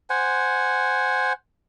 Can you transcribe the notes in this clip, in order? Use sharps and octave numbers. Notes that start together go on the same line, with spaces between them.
C5 F#5 G#5